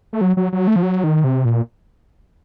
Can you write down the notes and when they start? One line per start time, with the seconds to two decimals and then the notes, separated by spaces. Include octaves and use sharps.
0.13 A3
0.21 F#3
0.37 F#3
0.53 F#3
0.68 A3
0.76 F3
0.83 F#3
1.04 D#3
1.24 C3
1.45 A#2